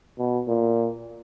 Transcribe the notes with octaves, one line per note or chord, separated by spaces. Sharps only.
B2
A#2